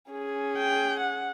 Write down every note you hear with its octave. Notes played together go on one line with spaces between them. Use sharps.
C#4 G#4
G5
F#5